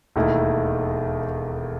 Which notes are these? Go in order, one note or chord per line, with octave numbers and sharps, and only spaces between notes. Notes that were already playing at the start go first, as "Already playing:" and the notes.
E1 D#2 D#3 A3 E4